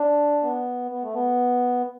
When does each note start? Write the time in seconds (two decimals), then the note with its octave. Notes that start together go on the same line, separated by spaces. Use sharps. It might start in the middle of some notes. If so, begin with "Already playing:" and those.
Already playing: D4
0.43 B3
0.91 B3
1.03 A3
1.14 B3